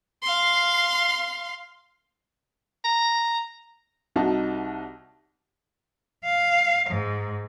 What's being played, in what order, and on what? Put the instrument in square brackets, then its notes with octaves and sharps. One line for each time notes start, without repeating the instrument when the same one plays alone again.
[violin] F5 C6
[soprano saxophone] A#5
[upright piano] C2 D#4 F#4 A5
[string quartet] F5
G#2